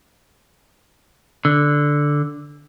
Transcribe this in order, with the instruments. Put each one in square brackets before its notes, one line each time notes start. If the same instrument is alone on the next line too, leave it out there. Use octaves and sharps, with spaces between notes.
[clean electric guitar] D3